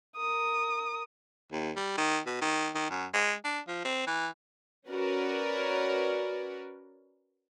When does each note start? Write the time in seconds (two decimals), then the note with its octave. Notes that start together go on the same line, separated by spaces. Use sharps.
0.17 A#4 D#6
1.52 D#2
1.76 G3
1.98 D#3
2.26 B2
2.41 D#3
2.75 D#3
2.90 F#2
3.14 G#3
3.44 D4
3.68 F3
3.85 C4
4.07 E3
4.89 C#4 F#4 A#4 B4 C#5 D5